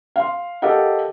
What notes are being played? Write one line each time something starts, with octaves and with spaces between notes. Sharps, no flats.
F5 C6
G4 A4 A#4 D#5 F5 F#5